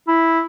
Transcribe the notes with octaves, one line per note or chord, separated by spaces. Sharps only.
E4